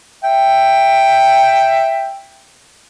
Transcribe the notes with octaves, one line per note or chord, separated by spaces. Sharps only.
E5 G5